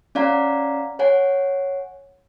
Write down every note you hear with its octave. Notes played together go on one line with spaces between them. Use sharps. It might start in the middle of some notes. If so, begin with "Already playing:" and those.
C#4 D5 F5 F#5 A#5
C#5 F#5 G#5